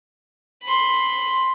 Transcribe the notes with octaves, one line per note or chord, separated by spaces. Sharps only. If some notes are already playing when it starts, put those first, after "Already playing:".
B5 C6